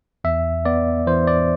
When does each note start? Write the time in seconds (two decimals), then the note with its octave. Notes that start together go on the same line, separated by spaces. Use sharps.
0.24 E2 E5
0.65 B3 D5
1.07 E3 C5
1.27 D5